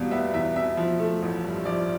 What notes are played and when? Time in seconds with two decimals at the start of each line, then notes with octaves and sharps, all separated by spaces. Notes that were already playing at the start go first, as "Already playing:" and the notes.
Already playing: E2 B2 G3 B3 F5
0.11 B3 E5
0.34 E2 E5
0.56 B2 E5
0.77 F3
0.99 A3
1.22 A1
1.44 G2
1.65 F3 D5